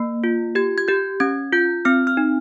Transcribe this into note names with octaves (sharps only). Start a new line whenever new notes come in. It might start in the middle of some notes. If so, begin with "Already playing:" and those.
Already playing: A#3
F4
G4 G#6
G#6
G4 G6
C#4 G#6
F4 G6
C4 F6
F6
D#4